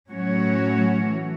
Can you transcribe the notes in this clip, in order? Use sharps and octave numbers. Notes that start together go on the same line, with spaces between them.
A2 F#3 C#4 F#4 C#5
E3 A3